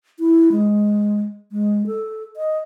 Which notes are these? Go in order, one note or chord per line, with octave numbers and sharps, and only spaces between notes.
E4
G#3
G#3
A4
D#5